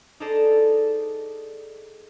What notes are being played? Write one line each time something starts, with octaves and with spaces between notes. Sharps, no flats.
D#4 G#4 A4 C5 D5 A5